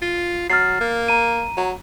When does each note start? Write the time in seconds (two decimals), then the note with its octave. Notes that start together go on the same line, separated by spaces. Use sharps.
0.02 F4
0.50 F#3 F6 A6 C7
0.81 A#3
1.08 A#5 D#7
1.57 F#3